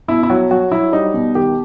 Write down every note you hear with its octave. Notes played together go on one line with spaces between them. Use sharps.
B2 E4
E4
F#3 F#4
F#3 F#4
F#3 E4
G3 D#4
B2
D#3 G4